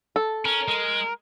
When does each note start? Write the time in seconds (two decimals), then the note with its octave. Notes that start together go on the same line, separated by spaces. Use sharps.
0.16 A4
0.45 C#4 A#4
0.68 G#3